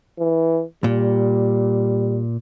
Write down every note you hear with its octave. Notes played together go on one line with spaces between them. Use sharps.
E3
A#2 G3